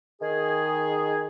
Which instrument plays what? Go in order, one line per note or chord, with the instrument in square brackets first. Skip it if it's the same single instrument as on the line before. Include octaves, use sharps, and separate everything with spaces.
[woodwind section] D#3 G#4